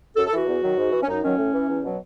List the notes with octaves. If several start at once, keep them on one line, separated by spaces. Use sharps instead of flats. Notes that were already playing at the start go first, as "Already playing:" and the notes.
F#2 A4
A4
E3 F#4
E2
D#3 F#3
G#2
E3
C#4
F#2 D#4
D#3 F#3 C#4
A2
E3
E2
B2 F#3